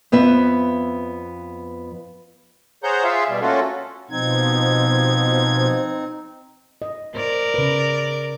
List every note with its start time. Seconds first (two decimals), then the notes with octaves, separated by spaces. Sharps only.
0.12 F2 B3 B4 E5
2.84 G#4 C5 C#5 F#5 A#5 G6
3.04 F4 G#4 E5 F5
3.29 B2 G3
3.41 A3 A#3 C#4 F4 F#4 A4
4.10 B2 F3 C4 D#4 G#6
6.82 D#5
7.16 A#4 C5 D5
7.54 C#3 B4